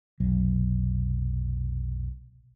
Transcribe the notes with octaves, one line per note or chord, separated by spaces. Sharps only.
F1 B1 F#3